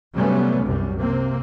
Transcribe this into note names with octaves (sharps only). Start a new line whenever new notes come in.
C3 F#3 G3 A3 B3 C#4
C2 F#2 C3 G3
C3 A#3 C4